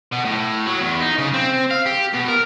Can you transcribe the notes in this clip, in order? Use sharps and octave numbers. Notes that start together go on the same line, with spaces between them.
B2
A2
F#3
E2
D#4
C#3
C4
F5
G4
B2
A#4